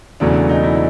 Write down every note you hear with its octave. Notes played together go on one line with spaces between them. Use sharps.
E1 E2 C#3 F#3 A3 D4
D#4
E4